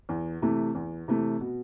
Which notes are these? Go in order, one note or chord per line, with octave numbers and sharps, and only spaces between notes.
E2
C3 E3 A3
E2
C3 E3 A3
B2